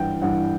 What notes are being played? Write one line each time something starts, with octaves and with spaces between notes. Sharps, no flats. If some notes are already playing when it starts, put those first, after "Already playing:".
Already playing: G2 E3 F#5 G5
G2 E3 F#5